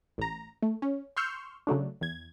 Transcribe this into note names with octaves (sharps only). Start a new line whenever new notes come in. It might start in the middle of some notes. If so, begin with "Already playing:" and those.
A1 A#5
A3
C#4
C6 C#6 E6 F6 G6
C#3 F#3 A3 D4
E2 G#6